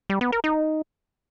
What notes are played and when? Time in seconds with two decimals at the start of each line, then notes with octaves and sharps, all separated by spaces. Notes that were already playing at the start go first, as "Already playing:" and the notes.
0.10 G3
0.21 B3
0.32 A#4
0.44 D#4